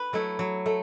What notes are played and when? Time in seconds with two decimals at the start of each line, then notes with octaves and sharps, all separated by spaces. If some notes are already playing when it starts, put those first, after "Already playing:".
Already playing: B4
0.13 F#3 A3 E4
0.39 F#3
0.66 A3